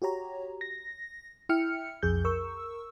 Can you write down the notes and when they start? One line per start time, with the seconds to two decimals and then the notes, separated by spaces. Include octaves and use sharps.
0.02 F#4 G4 C#5 A#5
0.61 A#6
1.49 E4 E5 G5 F6 C#7
2.03 B1 F2 G#4 G6
2.25 A#4 C#6 E6